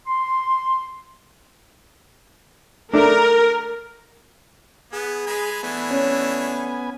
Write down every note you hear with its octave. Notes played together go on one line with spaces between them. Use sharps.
C6
A3 D4 A#4
B3 G#4
G#3 B4 G#5
E3 A3 B3 D4 G#5
C#4